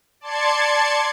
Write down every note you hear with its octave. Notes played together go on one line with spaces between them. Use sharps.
D5 A5 C6 G#6 C#7